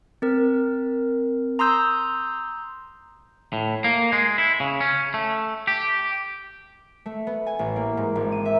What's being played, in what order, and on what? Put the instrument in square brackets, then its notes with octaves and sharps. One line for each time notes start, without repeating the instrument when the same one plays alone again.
[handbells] C4 A#4
A#5 C6 D#6 E6 G6
[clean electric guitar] A2
A#3
G#3
E4
C#3
C#4
A3
G4
[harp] A3
B3
G#5
A1
A#3
G#2
G#1
D#7
E5